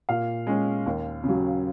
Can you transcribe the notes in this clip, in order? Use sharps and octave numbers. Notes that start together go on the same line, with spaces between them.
A#2 F5
G#3 C#4
D#2
C#3 F#3